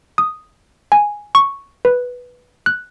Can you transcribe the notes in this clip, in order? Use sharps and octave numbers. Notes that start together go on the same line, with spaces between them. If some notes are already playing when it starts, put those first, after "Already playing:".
D#6
G#5
C#6
B4
F#6